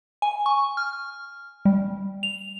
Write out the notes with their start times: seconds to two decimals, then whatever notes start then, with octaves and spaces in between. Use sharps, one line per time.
0.22 G#5
0.46 C#6
0.77 F6
1.65 G3
2.23 F7